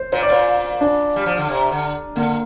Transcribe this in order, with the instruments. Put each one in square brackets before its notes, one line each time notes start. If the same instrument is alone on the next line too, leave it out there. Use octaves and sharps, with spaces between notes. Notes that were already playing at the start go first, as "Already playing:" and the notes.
Already playing: [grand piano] C5
[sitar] A#2 [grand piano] C5
[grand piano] D5
[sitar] A#2 [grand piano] C5
[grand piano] D4
[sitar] G3
F3
D3
C3
D3
[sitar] D3 [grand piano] A#3